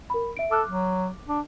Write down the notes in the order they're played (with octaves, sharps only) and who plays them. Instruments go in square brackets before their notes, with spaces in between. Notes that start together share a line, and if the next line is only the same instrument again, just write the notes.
[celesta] A#4 B5
E5 D7
[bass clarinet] A4 [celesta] D6 F6 F#6
[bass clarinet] F#3
D4